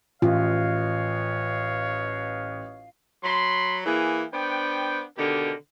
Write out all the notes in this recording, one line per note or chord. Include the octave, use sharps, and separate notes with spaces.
A1 F4 B4 C#5 D#5 F5
F#3 B5 C6
E3 A#3 G#4
B3 D4 C5 G5
B2 D3 D#3 G4 A#4